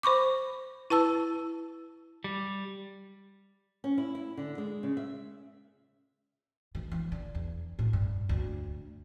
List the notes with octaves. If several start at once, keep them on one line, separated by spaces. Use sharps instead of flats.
C5 B5 C#6 D6
E4 B4 A5 E6
G3
C#4
E4
E4
D3
G#3
C#3
E5
D#3
E3
D3
E2
A2
G2
D2